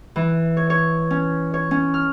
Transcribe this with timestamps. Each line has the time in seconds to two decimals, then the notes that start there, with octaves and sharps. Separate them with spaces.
0.16 E3
0.57 C#5
0.70 C#5
1.10 C#4
1.54 C#5
1.71 C#4
1.94 F6